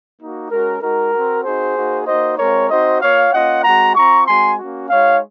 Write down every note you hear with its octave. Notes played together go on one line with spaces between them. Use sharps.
A#3 D#4 F#4
G#3 C#4 F#4 A#4
G#3 D#4 F#4 A#4
C4 F#4
C4 D#4 F#4 G#4 C5
A#3 D#4 F#4
A#3 D#4 F#4 C5 D#5
G#3 C4 F4 A#4 C#5
C4 D#4 F#4 C5 D#5
A#3 F4 C#5 F5
A#3 C#4 F4 D#5 F#5
G#3 C4 F#4 F#5 A#5
C4 F4 A#5 C#6
G#3 C4 F#4 G#5 C6
A#3 C#4 F#4
G#3 D#4 F#4 C#5 F5